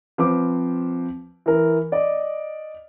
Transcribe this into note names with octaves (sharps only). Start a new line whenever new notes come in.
F3 C4 B4 D6
E3 A#4
D5 D#5